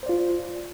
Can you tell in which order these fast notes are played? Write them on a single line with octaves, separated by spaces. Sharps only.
C5 D5 F4